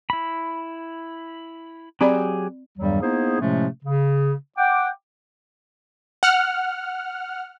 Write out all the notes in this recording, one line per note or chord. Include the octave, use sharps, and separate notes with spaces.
E4 B5
F#3 C4 G4 G#4 D5 B5
E2 G2 D#3 F#3 G3
A#3 B3 D#4 E4 G#4 C5
A2 C3 F3 G#3 A3 C#4
C#3
F#5 G5 D6
F#5 F6